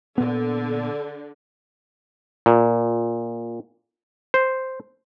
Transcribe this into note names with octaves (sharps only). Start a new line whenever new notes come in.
A#2 D3 B3
A#2
C5